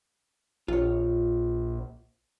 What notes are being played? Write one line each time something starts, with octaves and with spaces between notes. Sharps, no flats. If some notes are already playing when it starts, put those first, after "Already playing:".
A#1 F4 C#5